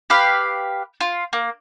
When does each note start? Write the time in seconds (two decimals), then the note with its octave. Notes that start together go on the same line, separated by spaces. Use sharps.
0.10 G4 B4 F5
1.01 F4
1.33 A#3